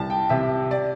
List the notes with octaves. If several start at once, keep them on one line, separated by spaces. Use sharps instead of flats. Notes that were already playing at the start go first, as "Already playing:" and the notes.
Already playing: C2 A5
G5
C3 E5
D5